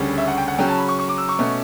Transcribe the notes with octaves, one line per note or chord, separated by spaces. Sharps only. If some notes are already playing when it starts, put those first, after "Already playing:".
Already playing: D2 C#3 G3 C#4
E5
F#5
G5
F#5
C#3 F#3 C#4 G5
A5
B5
C#6
C#6
D6
E6
C#6
B2 A3 C#4